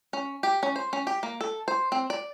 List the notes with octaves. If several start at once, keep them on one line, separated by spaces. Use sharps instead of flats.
C#4
G4
C#4
C5
C#4
G4
A#3
A4
C5
C4
D5